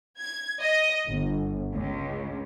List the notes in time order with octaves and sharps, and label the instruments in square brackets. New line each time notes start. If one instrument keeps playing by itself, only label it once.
[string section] G#6
D#5
G1
C#2